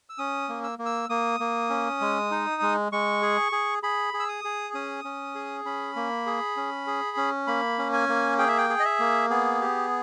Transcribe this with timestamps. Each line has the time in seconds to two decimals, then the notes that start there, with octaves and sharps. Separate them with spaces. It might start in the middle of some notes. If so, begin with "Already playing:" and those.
0.10 E6
0.18 C#4 D#6
0.49 A#3
0.64 E6
0.79 A#3
0.86 E6
1.09 A#3 D#6
1.40 A#3
1.70 C#4
2.01 G#3
2.31 D#4
2.62 G#3
2.92 G#3 C#6
3.22 G#4
3.52 G#4
3.83 G#4 B5
4.14 G#4
4.20 E6
4.29 D#6
4.44 G#4
4.74 C#4 D#6
5.05 C#4
5.35 G#4
5.65 C#4 B5
5.96 A#3
6.26 G#4
6.57 C#4
6.87 G#4
7.17 C#4
7.47 A#3 B5
7.79 C#4
7.93 G#5
8.09 A#3
8.39 G#4 G5
8.48 E5
8.58 G5
8.69 G#4
8.80 D#5
8.85 E5
9.00 A#3
9.30 B3 G#4
9.61 G4